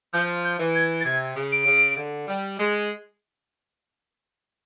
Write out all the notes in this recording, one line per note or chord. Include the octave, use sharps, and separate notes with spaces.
F3 G6
G6
E3
G#6
A6
C3 G#6
C#3
D7
C#3
D3
G3
G#3